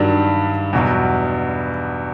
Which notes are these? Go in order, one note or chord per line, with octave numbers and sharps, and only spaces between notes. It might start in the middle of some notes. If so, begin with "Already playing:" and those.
Already playing: G2 D#3 F#3 G3
E2 B2 F#3